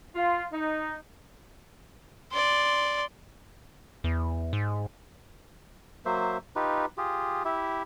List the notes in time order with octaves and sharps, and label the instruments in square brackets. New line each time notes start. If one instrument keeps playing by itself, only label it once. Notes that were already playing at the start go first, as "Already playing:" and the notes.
[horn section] F4
D#4
[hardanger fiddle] D5 C6
[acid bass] E2
G#2
[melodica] F#3 A#3 C5 E5
D#4 F4 G4 B4
F4 G4 G#4
E4 G4 E5